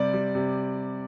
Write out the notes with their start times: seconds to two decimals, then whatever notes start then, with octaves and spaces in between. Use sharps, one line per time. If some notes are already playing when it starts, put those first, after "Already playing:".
Already playing: C3 G3 D5
0.13 G3
0.35 C3